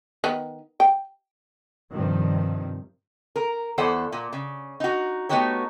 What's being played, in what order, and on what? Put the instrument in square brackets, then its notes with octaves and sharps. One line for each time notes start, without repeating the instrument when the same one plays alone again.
[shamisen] D#3 B3
G5
[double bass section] G2 C3 D#3 F3
[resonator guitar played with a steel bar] A#4
E2 A4 C5 D5 F#5
A#2
C#3
D#4 F#4
A3 B3 D#4 F#4 G4 C#5